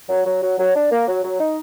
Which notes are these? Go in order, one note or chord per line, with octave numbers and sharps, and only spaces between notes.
F#3
F#3
F#3
F#3
D4
A#3
F#3
F#3
D#4